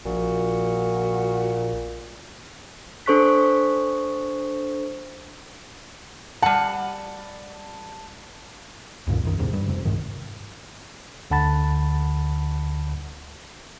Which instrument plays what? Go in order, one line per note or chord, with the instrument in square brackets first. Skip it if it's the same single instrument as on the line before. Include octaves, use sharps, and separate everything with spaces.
[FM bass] A#1 [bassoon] A#2 [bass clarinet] F#4
[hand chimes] D4 A4 C5 C#6 F#6 B6
[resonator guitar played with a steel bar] G3 F#5 [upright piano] A5
[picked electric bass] C2 F#2 A#2 D#3
B1 F#2 D#3
D1 E2 G#2 C3
G2
F2 C3
G1 C2 G#2 D#3
[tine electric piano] D2 D3 F#5 A5 B5 A6